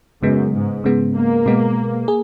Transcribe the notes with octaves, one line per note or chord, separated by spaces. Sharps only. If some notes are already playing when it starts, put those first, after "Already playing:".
F#2 C#3 G#3 B3
G#2
C#3 G#3 B3
A#3
B2 G#3 B3
G#4